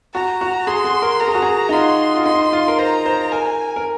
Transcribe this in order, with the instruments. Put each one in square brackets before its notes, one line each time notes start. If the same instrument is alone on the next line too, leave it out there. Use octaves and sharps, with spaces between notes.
[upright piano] F#4 [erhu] A#5
[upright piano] F#4
[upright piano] G#4 [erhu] C6
[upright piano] G#4
A#4
[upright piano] A#4 [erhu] A#5
[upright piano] G#4
F#4
G#4
D#4
[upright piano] F4 [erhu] C6
[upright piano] F4
[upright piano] D#4 [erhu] C6
[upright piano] F4
A#4
[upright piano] C5 [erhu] A#5
[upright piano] C5
[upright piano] A#4 [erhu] G#5
[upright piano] A#4